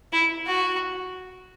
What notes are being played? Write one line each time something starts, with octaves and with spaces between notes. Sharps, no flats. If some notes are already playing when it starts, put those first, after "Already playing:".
E4
F#4